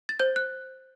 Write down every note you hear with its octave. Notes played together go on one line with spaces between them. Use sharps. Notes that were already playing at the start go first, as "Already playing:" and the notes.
A6
C5 G6
F#6